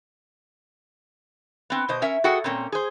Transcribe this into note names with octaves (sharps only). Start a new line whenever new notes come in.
B3 C4
B2 C5 D#5
C#4 A#4 E5
F#4 G#4 A4 F#5 G5
A#2 A#3 C4 C#4
G#4 C5